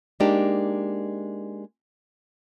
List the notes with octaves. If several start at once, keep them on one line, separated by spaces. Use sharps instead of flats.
G#3 A#3 D4 D#4 G4